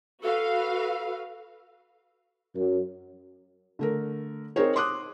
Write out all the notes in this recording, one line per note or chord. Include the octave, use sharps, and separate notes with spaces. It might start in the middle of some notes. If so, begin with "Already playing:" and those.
F#4 A4 B4 F5
F#2
D3 A3 A#4
C4 D#4 G#4 A#4 C5 C#5
C6 D6 D#6 F#6